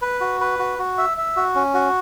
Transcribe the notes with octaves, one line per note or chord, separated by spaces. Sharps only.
B4
F#4
B4
F#4
F#4
E5
E5
F#4
C#4
F#4